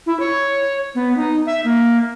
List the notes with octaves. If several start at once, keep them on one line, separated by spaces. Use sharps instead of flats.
E4
C#5
B3
D#4
E5
A#3